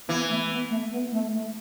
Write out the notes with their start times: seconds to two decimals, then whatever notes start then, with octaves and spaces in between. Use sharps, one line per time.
0.08 E3 B3
0.29 A3
0.50 B3
0.70 A3
0.91 B3
1.12 A3
1.31 A3